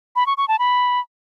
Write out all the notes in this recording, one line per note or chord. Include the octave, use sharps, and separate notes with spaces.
B5
C#6
C#6
A5
B5